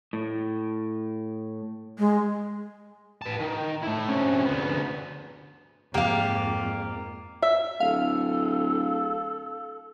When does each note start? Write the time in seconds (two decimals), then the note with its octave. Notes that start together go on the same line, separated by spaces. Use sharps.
0.13 A2
1.99 G#3
3.22 B4 A5
3.40 D#3
3.83 A3 E4
4.09 C3 C#4
4.45 D2 B3
5.94 F2 G#2 A#3 G4 F5
7.42 E5
7.80 D1 A4 F5